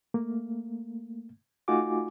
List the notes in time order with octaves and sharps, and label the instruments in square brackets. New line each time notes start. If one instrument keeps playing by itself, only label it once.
[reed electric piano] A3 A#3
A3 D#4 F4 F#4 G#5 D6